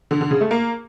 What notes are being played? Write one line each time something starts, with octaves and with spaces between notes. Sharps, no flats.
D3
D3
C#3
A3
A#3